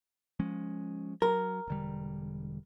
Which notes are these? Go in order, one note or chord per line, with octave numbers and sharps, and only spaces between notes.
F3 G#3 C#4
F#3 A#4
E1 D3 G3